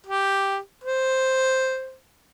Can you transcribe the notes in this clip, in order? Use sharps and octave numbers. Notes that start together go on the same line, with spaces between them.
G4
C5